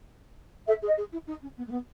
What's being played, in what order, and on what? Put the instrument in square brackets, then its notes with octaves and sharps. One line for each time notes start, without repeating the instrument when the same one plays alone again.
[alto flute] A4 [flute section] E5
[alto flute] G#4
[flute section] D#5
[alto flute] G#4
E4
D#4
C#4
B3
A3
B3